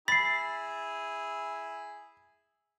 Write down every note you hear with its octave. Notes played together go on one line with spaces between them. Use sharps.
E4 G#4 B5 A6 B6 C7